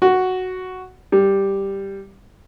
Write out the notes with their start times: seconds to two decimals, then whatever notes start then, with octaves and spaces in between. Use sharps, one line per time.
0.02 F#4
1.12 G3